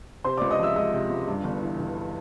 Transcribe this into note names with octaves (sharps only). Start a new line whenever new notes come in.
C3 C5 C6
C#2 D5 D6
D#5 D#6
F3 E5 E6
G#3 D#5 D#6
C3
C#2
G2
G1
E3
G1